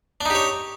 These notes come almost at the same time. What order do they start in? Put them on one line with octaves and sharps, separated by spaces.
D4 D#4 G4 C#5